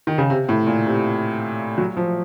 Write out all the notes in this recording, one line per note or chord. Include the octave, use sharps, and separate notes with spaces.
D#3
C#3
C3
A2
A#2
C3
F#3
F3